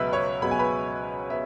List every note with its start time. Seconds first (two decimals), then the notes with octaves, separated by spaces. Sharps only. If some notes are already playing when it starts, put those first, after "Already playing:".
Already playing: C#2 B2 F#3 B3 B4 E5 B5 E6
0.13 C#5 C#6
0.42 C#2 B2 F#3 B3 B5
0.51 G#5
0.59 B4 B5
1.30 B3 E5